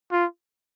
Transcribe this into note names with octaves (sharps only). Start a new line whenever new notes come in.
F4